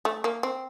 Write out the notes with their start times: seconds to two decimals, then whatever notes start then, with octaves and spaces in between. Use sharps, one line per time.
0.05 A3
0.24 A#3
0.43 C4